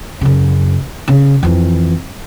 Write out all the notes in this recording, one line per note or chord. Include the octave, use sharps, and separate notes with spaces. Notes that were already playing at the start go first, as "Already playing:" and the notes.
F#2 C#3
C#3
F2 E3